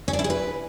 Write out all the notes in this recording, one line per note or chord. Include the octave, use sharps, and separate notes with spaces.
C#4
D4
E4
G#4
B4